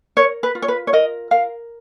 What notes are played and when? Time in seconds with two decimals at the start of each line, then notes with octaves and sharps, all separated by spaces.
0.17 A#4 C#5
0.43 B4
0.55 F4
0.62 C#5
0.68 B4
0.87 C#5
0.93 A#4 D#5
1.31 A#4 F5